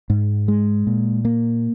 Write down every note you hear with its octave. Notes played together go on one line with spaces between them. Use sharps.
G#2
G#3
A#2
A#3